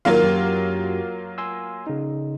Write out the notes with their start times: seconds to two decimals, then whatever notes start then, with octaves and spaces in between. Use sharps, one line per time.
0.05 D#3 F#3 A#3 F4
0.23 F#2 F#4 G4
1.38 G#5 C6 E6
1.87 C#3 D#4